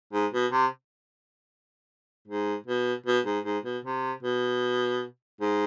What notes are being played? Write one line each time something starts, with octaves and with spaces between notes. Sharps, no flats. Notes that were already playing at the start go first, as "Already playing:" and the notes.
G#2
B2
C3
G#2
B2
B2
G#2
G#2
B2
C3
B2
G#2